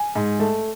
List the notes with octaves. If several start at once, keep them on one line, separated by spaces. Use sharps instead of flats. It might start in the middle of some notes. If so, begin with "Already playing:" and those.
Already playing: G#5
G#2
A3